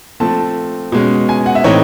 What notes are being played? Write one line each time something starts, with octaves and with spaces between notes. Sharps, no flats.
F3 A3 C4 A5
B2 G#3 C#4
G#5
F#5
E5
A2 E3 A3 C4 D#4 C#5